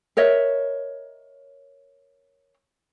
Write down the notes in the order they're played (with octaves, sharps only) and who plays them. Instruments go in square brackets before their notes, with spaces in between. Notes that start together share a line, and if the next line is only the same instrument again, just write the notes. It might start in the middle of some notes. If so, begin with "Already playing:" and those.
[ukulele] A#4 C#5 D#5 E5